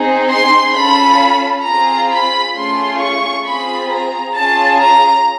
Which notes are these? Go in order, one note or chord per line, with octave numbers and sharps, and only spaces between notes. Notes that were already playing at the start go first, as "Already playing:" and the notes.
Already playing: C4 D#4 G#4
C6
C#4 F4 A4 B5
C4 F4 G#4 A#5
B5
A3 C#4 F4 G#4 C6
C#6
C4 F4 G#4 B5
A#5
C#4 F4 G#4 A5
A#5